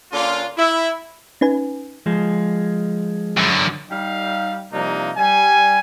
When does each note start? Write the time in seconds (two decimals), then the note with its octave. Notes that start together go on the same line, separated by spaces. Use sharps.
0.12 D3 A#3 C#4 D4 F4
0.57 E4
1.41 C#4 D#4 B4 G#5
2.06 F3 G#3
3.38 F#2 D3
3.90 G3 D#4 F5
4.73 C3 F3 G3 A#3 D4 D#4
5.17 G3 G#5